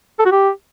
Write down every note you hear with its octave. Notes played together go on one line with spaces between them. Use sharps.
A4
F#4
G4